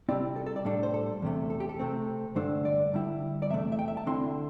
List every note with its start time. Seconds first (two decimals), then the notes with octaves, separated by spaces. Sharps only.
0.09 C3 G3 C4 E4 D5
0.36 A4
0.46 A4
0.56 D5
0.65 A2 G3 D4 A4
0.83 C5
0.94 A4
1.22 E2 C3 A3
1.50 A4
1.60 G4
1.69 A4
1.79 C3 A3 C4
2.36 G2 D3 A3 D4 C5
2.65 D5
2.94 D3 G3 E4
3.42 D5
3.49 E2 C3 A3 E5
3.72 E5
3.79 G5
3.88 E5
3.97 A5
4.06 D3 C4 E4 C6